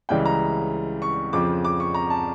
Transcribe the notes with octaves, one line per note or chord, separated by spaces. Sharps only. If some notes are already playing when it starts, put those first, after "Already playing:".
C#2 C#3 E3 G3 G5
A#5
C#6
F2 C#3 F3 D6
D6
C#6
A#5
A5